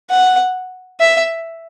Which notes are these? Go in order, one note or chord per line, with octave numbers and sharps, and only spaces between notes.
F#5
E5